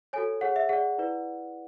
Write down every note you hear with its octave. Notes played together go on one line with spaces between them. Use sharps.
F#4 A4 C#5 G#5
G#4 C#5 F#5
E5
G#4 D5 F#5
E4 B4 D5